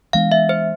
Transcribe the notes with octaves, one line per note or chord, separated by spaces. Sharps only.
E3 G#3 B3 D4 F5
E5
C5